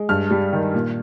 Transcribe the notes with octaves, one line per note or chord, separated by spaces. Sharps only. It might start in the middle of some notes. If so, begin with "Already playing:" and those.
Already playing: G#3
G2 F6
G3
D#3
A#2